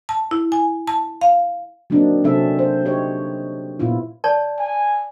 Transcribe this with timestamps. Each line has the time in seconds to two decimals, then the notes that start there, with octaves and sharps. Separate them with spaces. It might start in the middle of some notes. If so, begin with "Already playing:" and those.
0.09 A5
0.31 E4
0.52 G#5
0.87 A5
1.21 F5
1.90 F#3 A#3 C4 D4 D#4
2.24 C3 F#3 C4 C#4 A4 E5
2.59 C5
2.85 D#4 G4 C#5
3.79 A#2 B3 E4 F4
4.24 C#5 D5 A5
4.59 G#5